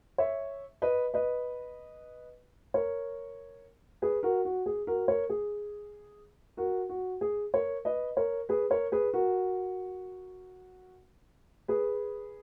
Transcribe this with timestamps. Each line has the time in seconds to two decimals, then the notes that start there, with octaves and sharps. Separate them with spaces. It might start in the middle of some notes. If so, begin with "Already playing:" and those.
0.18 C#5 E5
0.82 B4 D#5
1.14 B4 D#5
2.74 A#4 C#5
4.02 G#4 B4
4.23 F#4 A#4
4.45 F#4
4.66 G#4
4.87 F#4 A#4
5.08 A#4 C#5
5.30 G#4
6.57 F#4 A#4
6.89 F#4
7.21 G#4
7.54 A#4 C#5
7.85 B4 D#5
8.17 A#4 C#5
8.49 G#4 B4
8.70 A#4 C#5
8.92 G#4 B4
9.13 F#4 A#4
11.68 G#4 B4